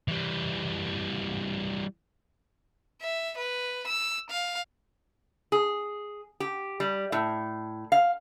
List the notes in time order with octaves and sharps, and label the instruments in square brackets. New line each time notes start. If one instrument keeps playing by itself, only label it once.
[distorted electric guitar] E3 G3
[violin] E5
B4
E6
F5
[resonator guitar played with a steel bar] G#4
G4
G3
A2
F5